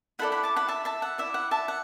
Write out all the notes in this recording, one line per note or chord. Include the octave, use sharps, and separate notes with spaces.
E4 A4 D5 F#5 B5
F#5 B5
A5 D6
F#5 B5
E5 A5
E5 A5
F#5
E4 D5 E5
F#5
E5 A5
F#5